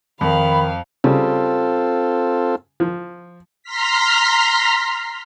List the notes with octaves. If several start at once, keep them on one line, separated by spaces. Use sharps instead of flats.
F2 D#3 F5 B5
C#3 G3 C4 F4 A4
F3
A#5 C6 F6 B6